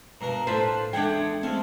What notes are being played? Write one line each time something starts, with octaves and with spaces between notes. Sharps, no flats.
G2 B2 A#4 A#5
A2 D4 F4 A4 B4 C5 G#5 A5
E2 G#3 A3 D4 F#5 G5 G#6
G#3 A3 C4 F4 D#5